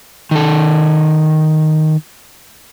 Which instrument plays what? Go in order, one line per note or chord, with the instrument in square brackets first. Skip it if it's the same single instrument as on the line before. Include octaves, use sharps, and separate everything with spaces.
[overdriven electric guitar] D#3 A4